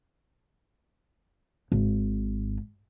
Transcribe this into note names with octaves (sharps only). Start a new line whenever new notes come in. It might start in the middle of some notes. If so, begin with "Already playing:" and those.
G#1